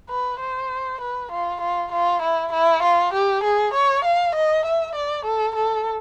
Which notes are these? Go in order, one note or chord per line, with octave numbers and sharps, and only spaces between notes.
B4
C5
B4
F4
F4
F4
E4
E4
F4
G4
G#4
C#5
F5
D#5
E5
D5
A4
A4